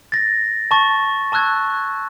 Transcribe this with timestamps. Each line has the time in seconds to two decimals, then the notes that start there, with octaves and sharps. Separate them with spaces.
0.12 A6 A#6
0.71 A5 C#6 A6
1.32 A5 C#6 E6 F#6 G#6